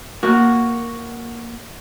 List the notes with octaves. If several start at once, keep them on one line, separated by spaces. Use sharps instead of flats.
A#3 F#4